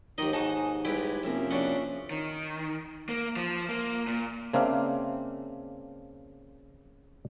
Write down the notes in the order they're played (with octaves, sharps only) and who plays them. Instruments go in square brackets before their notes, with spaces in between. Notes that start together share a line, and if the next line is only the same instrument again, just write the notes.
[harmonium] D#2 G#2 [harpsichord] D#3 D#5 [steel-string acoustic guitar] D#4 G4
[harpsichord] D#4 F#4 [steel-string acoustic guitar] G#5 A5
[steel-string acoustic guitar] G3 G#3 B4 [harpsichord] E4 G4
[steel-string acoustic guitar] F2 C3 A#3 [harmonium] F3 C#4 E5
[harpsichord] C#3 D4 F#4
[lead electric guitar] D#3
A#3
F3
A#3
A#2
[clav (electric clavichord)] C#3 A#3 C4 D4 E5 F5